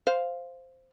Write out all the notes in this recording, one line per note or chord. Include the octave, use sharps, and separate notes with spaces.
C5 F5